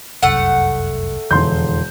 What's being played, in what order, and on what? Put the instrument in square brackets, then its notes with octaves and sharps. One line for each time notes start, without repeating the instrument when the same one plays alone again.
[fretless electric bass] F1 C2 F#2 [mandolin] A3 F#5
[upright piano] E1 C6 G6 [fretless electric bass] F2 D3 E3